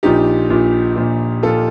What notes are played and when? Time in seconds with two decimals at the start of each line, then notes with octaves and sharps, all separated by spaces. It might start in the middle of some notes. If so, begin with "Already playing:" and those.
0.03 A#1 A#2 F3 D#4 G4
0.49 A#1 A#2 F3
0.96 A#1 A#2 F3
1.43 A#2 F3 F4 A4